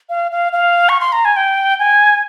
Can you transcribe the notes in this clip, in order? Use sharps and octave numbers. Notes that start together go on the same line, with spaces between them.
F5
F5
F5
C#6
C6
A#5
G#5
G5
G#5